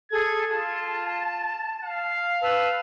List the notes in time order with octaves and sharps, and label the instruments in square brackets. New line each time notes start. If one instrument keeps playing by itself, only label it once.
[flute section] G#4 A4 [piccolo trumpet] G#6
[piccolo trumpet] F4 [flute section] A5
[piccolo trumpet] F5
[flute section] B4 A5 E6